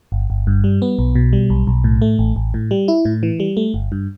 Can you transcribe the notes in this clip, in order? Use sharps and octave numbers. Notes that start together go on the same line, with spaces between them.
G1
G1
G2
G3
B3
B1
B2
G3
B1
B1
A2
A3
A1
A1
A2
G3
E4
A2
E3
G3
A3
G1
G2